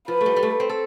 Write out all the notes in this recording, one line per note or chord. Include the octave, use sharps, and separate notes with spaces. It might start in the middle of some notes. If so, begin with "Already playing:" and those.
F3 B4
A3
G3
G3
A3
C4
A4